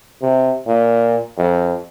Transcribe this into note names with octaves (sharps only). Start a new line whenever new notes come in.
C3
A#2
F2